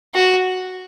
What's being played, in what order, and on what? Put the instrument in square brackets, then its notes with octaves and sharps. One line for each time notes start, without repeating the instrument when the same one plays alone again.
[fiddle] F#4